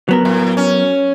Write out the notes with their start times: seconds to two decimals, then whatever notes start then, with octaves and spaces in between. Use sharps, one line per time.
0.09 F#3 B3 A#4
0.25 A2
0.57 C#4